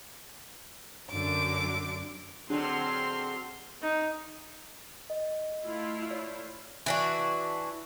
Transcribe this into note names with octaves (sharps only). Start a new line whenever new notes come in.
F#2 D3 D6
D3 F#3 C4 D4 G#4 C6 F6
D#4
D#5
A3 E4 F4
C#5 D5
E3 D4 F#4